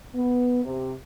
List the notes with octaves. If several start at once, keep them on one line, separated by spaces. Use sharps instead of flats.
B3
C3